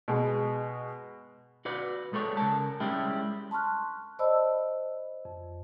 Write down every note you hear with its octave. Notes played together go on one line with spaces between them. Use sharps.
B2 G#3
F#4 B4 D5
G#3 A4 B4 C#5 D5
C#3 A#4 A5
G3 G#3 C#4 E4 G4
A5 C6 C#6 F6 F#6
C5 D5 D#5 A5 B5 E6
F2